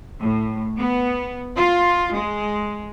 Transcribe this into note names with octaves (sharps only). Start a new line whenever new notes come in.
A2
B3
F4
G#3